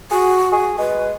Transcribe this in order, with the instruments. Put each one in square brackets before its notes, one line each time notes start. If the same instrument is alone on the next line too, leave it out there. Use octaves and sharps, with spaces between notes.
[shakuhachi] F#4 [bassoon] G#4
[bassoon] G#4
[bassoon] G#3 [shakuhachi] B4